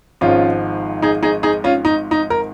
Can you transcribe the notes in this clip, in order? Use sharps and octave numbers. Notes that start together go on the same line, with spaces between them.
G#1 G#2 F3 C#4 F4
D#4 G#4
D#4 G#4
D#4 G#4
C#4 F4
D#4
D#4
A#4